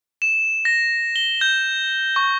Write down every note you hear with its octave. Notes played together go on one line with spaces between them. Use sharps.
E7
A#6
G7
G6
C#6